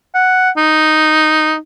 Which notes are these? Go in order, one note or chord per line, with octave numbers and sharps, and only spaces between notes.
F#5
D#4